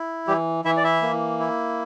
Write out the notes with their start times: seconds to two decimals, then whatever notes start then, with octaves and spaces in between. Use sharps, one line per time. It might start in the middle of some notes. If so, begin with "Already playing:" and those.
Already playing: E4
0.28 E3 G3 G4
0.65 E3 E4 E5
0.77 D5
0.84 E4 E5
1.02 A#3
1.39 E4